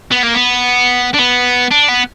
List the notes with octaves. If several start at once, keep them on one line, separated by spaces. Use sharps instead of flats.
B3
A#3
B3
D4
B3
D4
B3